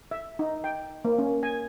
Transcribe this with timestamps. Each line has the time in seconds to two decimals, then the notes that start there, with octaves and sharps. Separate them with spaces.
0.11 E5
0.39 D#4
0.64 G5
1.05 A#3
1.18 C#4
1.43 G#5